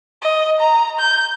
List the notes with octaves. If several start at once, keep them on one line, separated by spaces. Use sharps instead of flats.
D#5
A#5
G6